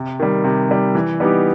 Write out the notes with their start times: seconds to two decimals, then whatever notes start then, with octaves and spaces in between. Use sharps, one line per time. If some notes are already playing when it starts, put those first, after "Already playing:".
Already playing: C3
0.20 D#3 G3
0.44 C3
0.69 D#3 G3
0.95 E3
1.20 G3 B3 D#4 G4